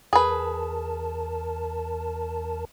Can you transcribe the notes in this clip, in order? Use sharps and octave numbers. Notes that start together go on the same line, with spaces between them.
E2 G#4 A#4 B4 A5